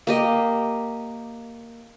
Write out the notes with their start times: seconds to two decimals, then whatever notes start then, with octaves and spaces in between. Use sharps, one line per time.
0.07 A#3 G4 D#5